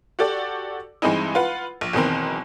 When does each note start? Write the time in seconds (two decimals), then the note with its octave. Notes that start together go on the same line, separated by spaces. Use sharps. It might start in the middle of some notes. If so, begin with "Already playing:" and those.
0.19 F#4 G4 A4 D5
1.02 G2 E3 G#3 C4 D#4 E4
1.35 F4 B4 F#5
1.81 A#1
1.93 F#1 B2 D#3 E3 C4 A#4